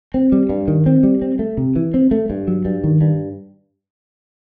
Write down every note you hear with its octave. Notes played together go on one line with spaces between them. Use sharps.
C4
G3
G2
D#3
C4
G3
C4
A3
C3
E3
C4
A3
G2
F#3
G2
D#3
G2